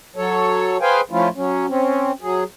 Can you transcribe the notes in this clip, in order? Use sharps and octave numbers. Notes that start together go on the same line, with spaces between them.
F#3 A4 C#5
G#4 B4 C5 F5 G5 G#5
F3 A3 C#4 E4 F4
F#3 C#4
C4 C#4
F#3 G#4